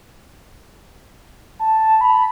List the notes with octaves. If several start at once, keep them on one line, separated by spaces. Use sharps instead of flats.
A5
B5